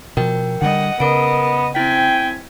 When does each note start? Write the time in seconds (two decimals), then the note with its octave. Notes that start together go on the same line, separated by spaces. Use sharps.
0.17 B2 F3 A#4 G5
0.62 D3 E3 G3 D#5 F#5
1.00 C#3 B3 A#4 D#5 D7
1.75 C4 E4 G5 G#5 B6